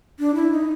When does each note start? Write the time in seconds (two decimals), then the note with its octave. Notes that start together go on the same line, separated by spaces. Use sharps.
0.19 D4
0.35 E4
0.51 D#4